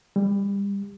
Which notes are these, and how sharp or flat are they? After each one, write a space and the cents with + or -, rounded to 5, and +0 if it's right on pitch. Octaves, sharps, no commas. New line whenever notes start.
G3 +30